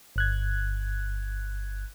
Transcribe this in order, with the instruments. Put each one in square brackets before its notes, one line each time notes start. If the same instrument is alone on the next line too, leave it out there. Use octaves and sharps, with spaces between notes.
[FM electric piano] G1 F#6 G#6